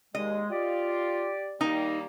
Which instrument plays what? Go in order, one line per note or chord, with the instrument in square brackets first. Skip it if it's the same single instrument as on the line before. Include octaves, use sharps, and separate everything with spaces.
[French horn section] D#2 [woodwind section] G#3 [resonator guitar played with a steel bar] D#5
[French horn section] F4 [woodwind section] G4 D5
[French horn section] D#3 G3 A#3 [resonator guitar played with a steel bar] D#4